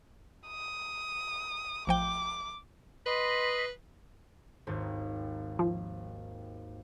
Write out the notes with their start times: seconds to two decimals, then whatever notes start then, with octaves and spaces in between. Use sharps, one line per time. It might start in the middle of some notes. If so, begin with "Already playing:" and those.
0.48 D#6
1.87 A1 F3 G5 D6
3.06 B4 D#5 B5 C6
4.67 G#1 D#2 G#2
5.59 F3